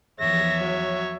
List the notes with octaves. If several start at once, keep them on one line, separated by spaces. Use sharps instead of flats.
E2 F3 C#5 E5 A#6
F#3